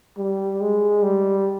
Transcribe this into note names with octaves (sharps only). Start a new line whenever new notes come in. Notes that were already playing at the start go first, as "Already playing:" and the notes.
G3
G#3
G3